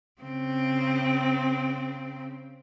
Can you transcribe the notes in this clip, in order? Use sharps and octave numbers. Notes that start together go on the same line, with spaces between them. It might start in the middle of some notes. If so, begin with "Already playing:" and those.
C#3 C4